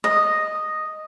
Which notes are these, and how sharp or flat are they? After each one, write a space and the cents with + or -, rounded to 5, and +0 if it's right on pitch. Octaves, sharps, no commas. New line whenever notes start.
D#5 -5